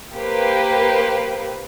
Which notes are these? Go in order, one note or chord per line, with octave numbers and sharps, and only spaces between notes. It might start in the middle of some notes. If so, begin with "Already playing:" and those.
A#3 G4 B4 C5